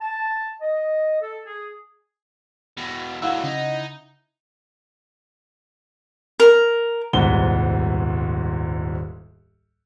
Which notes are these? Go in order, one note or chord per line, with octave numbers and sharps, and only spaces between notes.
A5
D#5
A4
G#4
E2 B2
F#3 A3 E4 F5 F#5 E6
C#3 D#4
A#4
D#1 C2 G#2 B3 B4 G7